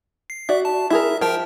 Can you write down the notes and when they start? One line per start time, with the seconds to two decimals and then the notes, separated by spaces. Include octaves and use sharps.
0.30 C7
0.49 F#4 D5 E5
0.65 A5
0.90 E4 G#4 A#4 E5
1.21 F3 G4 A#4 G5